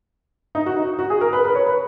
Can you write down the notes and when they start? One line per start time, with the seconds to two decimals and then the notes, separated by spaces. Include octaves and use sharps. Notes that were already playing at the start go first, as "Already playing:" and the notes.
0.55 D#4
0.66 F#4
0.76 D#4
0.99 F#4
1.10 G#4
1.21 A#4
1.33 B4
1.44 B4
1.55 C#5
1.66 B4